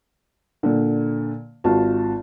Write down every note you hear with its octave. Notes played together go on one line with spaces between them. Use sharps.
A#2 D3
G#1 F4 F#4 A5